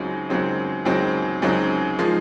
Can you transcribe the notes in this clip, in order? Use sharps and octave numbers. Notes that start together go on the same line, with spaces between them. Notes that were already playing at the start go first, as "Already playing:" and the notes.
Already playing: C#2 C#3 F#3 C4 D#4
C#2 C#3 F#3 C4 D#4
C#2 C#3 F#3 C4 D#4
C#2 C#3 F#3 C4 D#4
F3 G#3 D#4